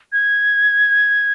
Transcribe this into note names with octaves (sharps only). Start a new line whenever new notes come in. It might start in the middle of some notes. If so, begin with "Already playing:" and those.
G#6